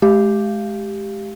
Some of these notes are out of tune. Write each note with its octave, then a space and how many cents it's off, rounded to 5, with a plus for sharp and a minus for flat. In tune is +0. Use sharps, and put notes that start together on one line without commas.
G#3 +35 G4 +0 F5 -15